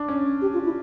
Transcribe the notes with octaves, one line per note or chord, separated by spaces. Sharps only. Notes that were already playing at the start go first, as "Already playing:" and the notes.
Already playing: D4
C#4
G4
F4
E4